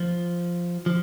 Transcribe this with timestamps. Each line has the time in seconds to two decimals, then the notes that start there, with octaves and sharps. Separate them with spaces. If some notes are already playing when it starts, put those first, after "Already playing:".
Already playing: F3
0.86 F3